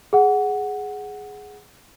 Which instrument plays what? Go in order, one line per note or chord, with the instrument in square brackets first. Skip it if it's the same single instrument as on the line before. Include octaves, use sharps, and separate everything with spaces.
[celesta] G#4 F#5